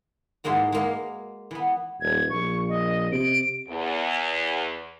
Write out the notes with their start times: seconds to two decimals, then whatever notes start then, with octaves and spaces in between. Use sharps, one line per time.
0.44 G#2 E3 G#3 A#3 F#4
0.72 G#3 A#3
1.51 E3 B3
2.01 D#1 G#6
2.30 A#1 C#6
2.69 D#5
3.12 C3 D7
3.68 E2